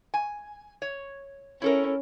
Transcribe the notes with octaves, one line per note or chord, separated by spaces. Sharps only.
G#5
C#5
C#4 E4 A4 A#4